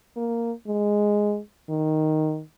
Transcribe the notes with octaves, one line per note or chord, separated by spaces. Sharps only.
A#3
G#3
D#3